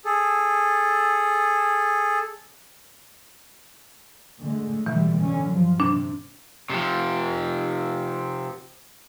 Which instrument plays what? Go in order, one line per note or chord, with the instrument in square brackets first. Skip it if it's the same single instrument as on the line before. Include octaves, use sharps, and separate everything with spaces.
[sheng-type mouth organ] G#4 A4
[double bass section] D3 G#3 A3
[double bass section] B2 D3 G3 [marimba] E3
[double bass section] D3 C#4
G2 F3 F#3
[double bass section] C3 [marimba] D4
[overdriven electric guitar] C3 F3